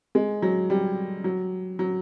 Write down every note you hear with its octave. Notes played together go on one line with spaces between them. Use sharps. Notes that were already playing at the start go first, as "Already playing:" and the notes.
G#3
F#3
G3
F#3
F#3